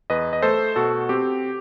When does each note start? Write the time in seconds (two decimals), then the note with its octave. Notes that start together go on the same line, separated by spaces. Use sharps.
0.10 E2 B4 D#5
0.33 D#5
0.42 A3 A4 C5
0.76 B2 F#4 A4
1.09 C4 G4